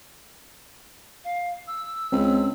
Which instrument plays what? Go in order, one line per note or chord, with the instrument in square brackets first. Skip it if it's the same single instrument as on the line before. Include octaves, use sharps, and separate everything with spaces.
[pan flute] F5
E6
[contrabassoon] C#2 [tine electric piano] C4